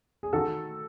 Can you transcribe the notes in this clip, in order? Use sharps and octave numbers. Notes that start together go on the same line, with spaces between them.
G#4
D#3 F#4 A4